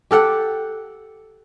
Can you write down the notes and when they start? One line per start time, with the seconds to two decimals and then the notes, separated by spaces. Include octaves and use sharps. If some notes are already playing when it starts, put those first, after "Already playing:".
0.11 G4 A4 F#5